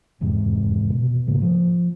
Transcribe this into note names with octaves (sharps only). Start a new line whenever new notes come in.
F1 E2 G#2 C3
B2
A1 G#2 C#3 A#3
F3